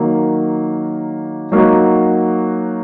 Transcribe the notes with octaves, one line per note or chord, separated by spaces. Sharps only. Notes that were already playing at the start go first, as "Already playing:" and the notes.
Already playing: D#3 F#3 A#3
F#3 A#3 D#4 F#4